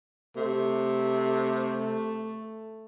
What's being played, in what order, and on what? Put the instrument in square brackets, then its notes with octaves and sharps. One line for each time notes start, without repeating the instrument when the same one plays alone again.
[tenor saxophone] C3 [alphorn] A3